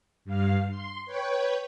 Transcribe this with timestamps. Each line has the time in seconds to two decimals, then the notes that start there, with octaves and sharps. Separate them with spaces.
0.25 G2 F5
0.71 C6
1.06 B4 C#5 G5